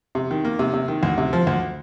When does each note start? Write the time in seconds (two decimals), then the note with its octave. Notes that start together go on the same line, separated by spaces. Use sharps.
0.15 C3
0.31 D#3
0.45 A#3
0.59 C3
0.73 C3
0.88 D#3
1.03 D2
1.18 C3
1.33 F3
1.47 D2